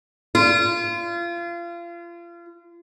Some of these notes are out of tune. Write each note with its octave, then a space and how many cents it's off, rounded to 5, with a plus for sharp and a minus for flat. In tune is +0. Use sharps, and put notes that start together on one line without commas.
F4 -30